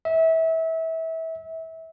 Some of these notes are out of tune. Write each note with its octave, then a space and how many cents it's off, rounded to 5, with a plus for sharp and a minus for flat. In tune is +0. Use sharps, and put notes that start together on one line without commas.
E5 -25